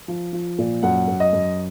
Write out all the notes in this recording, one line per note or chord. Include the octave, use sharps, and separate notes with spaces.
F3
F3
A#2
F#2 F#5
F#2
D#5
F#2